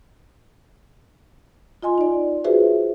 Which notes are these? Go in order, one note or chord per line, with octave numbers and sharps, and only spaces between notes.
F4 D#5 G#5 C6
D#4 D5
F4 F#4 G#4 B4 C5 E5